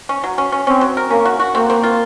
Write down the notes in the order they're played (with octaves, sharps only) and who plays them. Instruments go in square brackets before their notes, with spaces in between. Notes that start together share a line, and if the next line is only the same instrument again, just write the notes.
[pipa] C#4
F#3
C#4
C#4
[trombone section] C4 [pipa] C#4
[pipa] F#3
A#4
[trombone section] A#3 [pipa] C#4
[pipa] F#4
F#4
[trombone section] A#3 [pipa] C4
[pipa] C4
F4